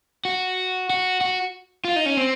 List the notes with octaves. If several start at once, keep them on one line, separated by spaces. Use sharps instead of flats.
F#4
F#4
F#4
F4
D#4
C#4
C4